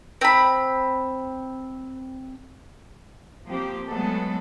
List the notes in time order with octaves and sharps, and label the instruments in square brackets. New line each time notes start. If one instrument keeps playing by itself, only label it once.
[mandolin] C4 B5
[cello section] F3 A#3 C4 G4 C5
F#3 G#3 A3 B3 A4